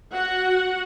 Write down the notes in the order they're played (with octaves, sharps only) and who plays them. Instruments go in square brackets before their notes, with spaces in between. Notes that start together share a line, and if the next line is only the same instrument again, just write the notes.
[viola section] F#4 F#5